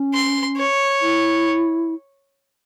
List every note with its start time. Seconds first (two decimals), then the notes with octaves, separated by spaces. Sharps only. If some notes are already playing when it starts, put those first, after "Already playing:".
Already playing: C#4
0.13 C6
0.57 C#5
1.02 E4